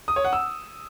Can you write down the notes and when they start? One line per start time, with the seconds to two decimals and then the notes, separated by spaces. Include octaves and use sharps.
0.08 D#6
0.16 C#5
0.24 F#5
0.33 E6